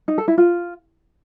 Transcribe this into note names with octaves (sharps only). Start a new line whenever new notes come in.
D#4
A4
E4
F4